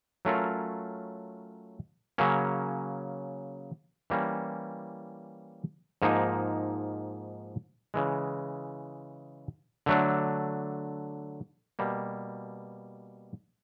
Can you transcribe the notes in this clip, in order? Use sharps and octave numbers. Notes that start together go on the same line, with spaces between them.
F#3 A3 C#4 F4 A#4
C#3 F#3 A#3 C#4
E3 G3 A#3 C#4
G#2 F3 A#3 D#4
C#3 E3 G#3
D3 F#3 A3 D4
B2 G3 A#3